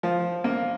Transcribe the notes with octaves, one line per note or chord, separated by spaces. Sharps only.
F3
A#3